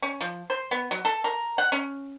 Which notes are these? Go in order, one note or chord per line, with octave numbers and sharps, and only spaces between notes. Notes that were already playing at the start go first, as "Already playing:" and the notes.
C#4
F3
C5
B3
F#3
A4
A#4
F#5
C#4